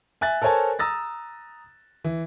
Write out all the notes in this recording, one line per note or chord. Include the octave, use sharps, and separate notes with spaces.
E5 G#5 F#6 A6
A4 A#4 C5 C#5 G#5 A5
A#5 D#6 E6 A6 A#6
E3